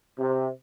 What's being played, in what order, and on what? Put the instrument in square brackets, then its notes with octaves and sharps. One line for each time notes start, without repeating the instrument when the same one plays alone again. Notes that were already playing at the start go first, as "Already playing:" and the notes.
[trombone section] C3